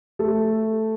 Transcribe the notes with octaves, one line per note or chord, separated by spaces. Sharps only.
A3 A4